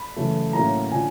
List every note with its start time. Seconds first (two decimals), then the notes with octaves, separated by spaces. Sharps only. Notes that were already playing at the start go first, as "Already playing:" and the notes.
Already playing: B5
0.16 F#2 C#3 E3 A3
0.53 A2 F#3 A#3 C#4 E4 A#5
0.91 D3 F3 G#5